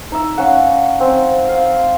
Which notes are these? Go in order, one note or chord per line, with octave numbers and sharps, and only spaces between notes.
D#4 E5
C#4 F5 F#5
C4
F5